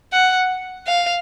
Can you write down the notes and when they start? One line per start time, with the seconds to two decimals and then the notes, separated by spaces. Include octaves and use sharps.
0.13 F#5
0.87 F5